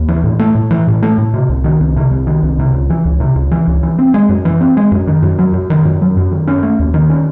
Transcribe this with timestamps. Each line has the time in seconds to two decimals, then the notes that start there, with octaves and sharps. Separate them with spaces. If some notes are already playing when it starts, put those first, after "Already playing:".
Already playing: D#2
0.08 E3
0.24 A2
0.39 A3
0.55 A2
0.71 E3
0.87 A2
1.03 A3
1.18 A2
1.34 C3
1.49 C2
1.64 D#3
1.80 C2
1.96 C3
2.11 C2
2.27 D#3
2.43 C2
2.59 C3
2.73 C#2
2.90 E3
3.05 C#2
3.20 C3
3.35 C#2
3.51 E3
3.67 C#2
3.83 E3
3.99 C4
4.14 G#3
4.29 F#2
4.45 E3
4.61 C4
4.77 G#3
4.92 F#2
5.07 D#3
5.22 F#2
5.39 F#3
5.54 F#2
5.70 D#3
5.85 F#2
6.01 F#3
6.17 F#2
6.32 D#3
6.47 C#4
6.63 A3
6.79 D#2
6.94 D#3
7.09 C#4